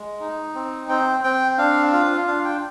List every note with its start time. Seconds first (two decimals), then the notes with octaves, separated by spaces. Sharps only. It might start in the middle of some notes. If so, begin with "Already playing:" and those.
Already playing: G#3
0.20 D#4
0.55 C4
0.89 C4 G5
1.23 C4 G5
1.58 D4 F5
1.93 F4 F5
2.27 D4 F5
2.45 G5